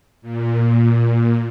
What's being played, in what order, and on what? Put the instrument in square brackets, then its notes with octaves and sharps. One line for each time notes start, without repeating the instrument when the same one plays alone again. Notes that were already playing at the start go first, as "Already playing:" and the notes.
[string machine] A#2